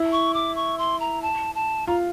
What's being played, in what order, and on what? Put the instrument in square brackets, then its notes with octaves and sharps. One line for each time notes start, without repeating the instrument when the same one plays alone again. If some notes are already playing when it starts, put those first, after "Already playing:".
Already playing: [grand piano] E4
[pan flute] C#6
D6
C#6
C6
A#5
A5
A5
[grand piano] F4 [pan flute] A#5